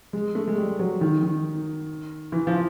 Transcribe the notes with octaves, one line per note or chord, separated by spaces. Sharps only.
G#3
A3
G#3
G3
F#3
D#3
D#3
E3
F3